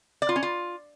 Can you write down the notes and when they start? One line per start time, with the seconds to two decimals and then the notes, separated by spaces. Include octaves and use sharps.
0.22 D5
0.29 F4
0.36 C#4
0.43 F4